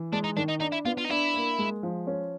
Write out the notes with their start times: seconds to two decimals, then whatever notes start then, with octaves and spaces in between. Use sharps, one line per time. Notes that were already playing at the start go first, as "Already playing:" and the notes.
Already playing: E3
0.12 G#3 D4
0.24 D#4
0.37 D#3 D4
0.49 D#4
0.61 D4 D#4
0.72 E4
0.85 B3 F4
0.98 F4
1.04 D#4
1.10 D4 E4
1.34 A#3
1.59 G#3
1.83 F3
2.07 C#4